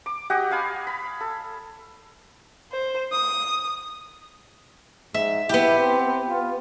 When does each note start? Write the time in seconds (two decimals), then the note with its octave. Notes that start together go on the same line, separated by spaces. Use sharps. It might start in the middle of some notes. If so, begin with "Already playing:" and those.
0.06 D6
0.30 F#4 G4 D#5 F#5
0.51 C#5 F5 G#5 B5
0.87 B5
1.21 A4
2.72 C5
3.12 D#6
5.14 G#2 E5
5.49 B3 E4 G4
5.79 C4
6.29 F4